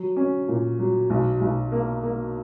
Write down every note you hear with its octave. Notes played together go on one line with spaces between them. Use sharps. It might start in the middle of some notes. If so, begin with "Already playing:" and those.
Already playing: F#3
C#4
A#2
F#3
B1
B1
A#3
A#3